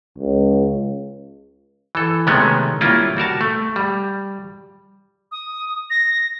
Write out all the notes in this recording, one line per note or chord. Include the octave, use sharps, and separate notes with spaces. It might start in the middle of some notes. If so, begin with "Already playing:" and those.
C#2
E3 A4
C3 D#3 G#3 A3 B3 C#4
G3 A#3 C#4 E4 F4
G3 F#4 A#4 A5
A3
G3
D#6
A#6